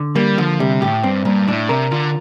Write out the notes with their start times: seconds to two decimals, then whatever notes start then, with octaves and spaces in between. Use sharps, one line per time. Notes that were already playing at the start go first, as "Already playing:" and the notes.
Already playing: D3
0.16 G3 A#3
0.38 D3 F3
0.60 C3 G3
0.81 A2 G4
1.04 G2 C4
1.25 G2 A#2
1.47 A2 D4
1.69 C3 A#4
1.91 D3 F4